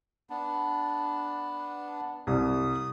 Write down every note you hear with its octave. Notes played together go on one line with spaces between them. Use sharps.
B3 D4
C2 D#6